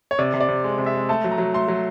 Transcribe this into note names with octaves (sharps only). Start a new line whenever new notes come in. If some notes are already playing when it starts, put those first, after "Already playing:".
C#5
C3 D5
C3
D5
C3
G#3
C3
E5
G#3
A3 A5
F#3
A#5
F#3
A3 C6
F#3